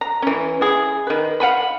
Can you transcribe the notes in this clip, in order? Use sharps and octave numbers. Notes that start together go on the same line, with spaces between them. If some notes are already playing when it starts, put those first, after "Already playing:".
A#5
E3 C#4
E4 G#4
D#3 B4
F5 F#5 G#5 B5